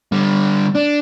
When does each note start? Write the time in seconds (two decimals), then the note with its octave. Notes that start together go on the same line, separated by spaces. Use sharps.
0.12 D3 G3
0.75 D4